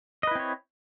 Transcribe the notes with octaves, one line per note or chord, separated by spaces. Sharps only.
C4 E4 B4 C#5 D#5